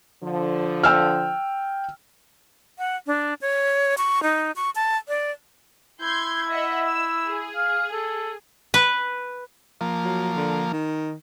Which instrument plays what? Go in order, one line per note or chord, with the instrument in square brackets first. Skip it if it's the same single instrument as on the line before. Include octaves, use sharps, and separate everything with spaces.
[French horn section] D3 F3
[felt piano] G5 E6 F6
[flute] F#5
D4
C#5
C#6
D#4
C#6
A5
D5
[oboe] E4 [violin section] C6 G6 G#6
[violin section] D#5 E5 F#5
E6
G#4
[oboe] F5
A4
[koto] B4
[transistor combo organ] F3 A#3
[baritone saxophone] F#3
D3
D#3